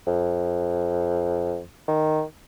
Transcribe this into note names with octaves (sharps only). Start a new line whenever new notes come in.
F2
D#3